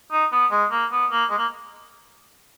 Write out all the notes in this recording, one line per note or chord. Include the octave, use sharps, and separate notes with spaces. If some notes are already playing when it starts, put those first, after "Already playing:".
D#4
B3
G#3
A#3
B3
A#3
G#3
A#3